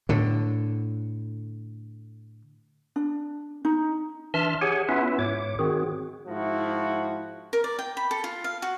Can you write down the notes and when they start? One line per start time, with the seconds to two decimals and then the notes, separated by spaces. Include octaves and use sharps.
0.09 A2 D3
2.96 D4
3.65 D#4
4.34 E3 D4 E5 A5 C6 F6
4.61 G4 G#4 C#5 F#5 G#5
4.89 B3 C#4 E4 F4 B4 E5
5.19 G#2 C#5 D6
5.59 D#3 C4 F#4 G#4
6.27 G#2 F3 E4 F#4
7.53 A#4
7.64 D5
7.79 G5
7.97 B5
8.11 A4
8.24 F4
8.44 F5
8.62 F#4